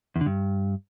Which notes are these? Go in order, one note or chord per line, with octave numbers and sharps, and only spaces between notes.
E2
D3
G2